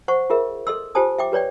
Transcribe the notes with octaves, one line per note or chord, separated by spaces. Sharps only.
C5 F#5 C#6
F4 G#4 A#4 E5
A4 D#5 C6 E6
F4 G4 C5 G#5 A5 D#6
E5 G5 D6
G4 B4 C#5 D5 G5